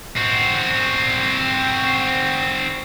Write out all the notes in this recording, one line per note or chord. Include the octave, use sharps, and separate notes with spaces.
C4 F#4